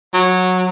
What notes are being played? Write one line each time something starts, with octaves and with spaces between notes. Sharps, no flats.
F#3